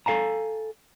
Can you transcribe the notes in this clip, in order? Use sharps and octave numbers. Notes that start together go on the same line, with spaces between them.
A4 F5 G#5 A#5